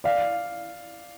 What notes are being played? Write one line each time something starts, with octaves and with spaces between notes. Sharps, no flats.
D5 F5